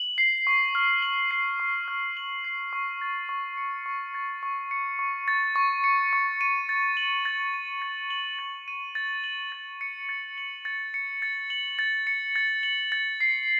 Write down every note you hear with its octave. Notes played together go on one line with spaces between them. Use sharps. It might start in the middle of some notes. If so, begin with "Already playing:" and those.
Already playing: F#7
C7
C#6
F6
F#7
C7
C#6
F6
F#7
C7
C#6
A6
C#6
C#7
C#6
A6
C#6
C#7
C#6
A6
C#6
C#7
C#6
D#7
A6
F#7
A6
D#7
A6
F#7
A6
D#7
A6
F#7
A6
C#7
A6
F#7
A6
C#7
A6
F#7
A6
C#7
A6
F#7
A6
C7